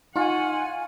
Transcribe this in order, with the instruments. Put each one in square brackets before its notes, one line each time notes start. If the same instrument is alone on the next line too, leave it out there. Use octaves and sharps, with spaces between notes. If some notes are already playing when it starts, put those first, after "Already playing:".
[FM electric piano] D#4 [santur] F4 C#6 [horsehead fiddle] F#5 [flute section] G#5